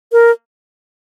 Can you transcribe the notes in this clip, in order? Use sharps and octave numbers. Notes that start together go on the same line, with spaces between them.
A#4